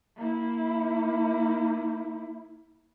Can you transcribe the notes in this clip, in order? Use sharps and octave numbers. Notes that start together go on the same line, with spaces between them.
A#3 E4